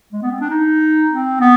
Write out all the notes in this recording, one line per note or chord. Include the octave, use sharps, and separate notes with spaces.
G#3
B3
C4
D4
D#4
C4
B3